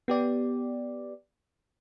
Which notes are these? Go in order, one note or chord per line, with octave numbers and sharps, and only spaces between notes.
B3 G4 D5